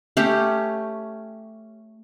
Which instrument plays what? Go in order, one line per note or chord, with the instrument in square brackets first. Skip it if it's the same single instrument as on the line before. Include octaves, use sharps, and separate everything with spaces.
[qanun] A3 C#4 G4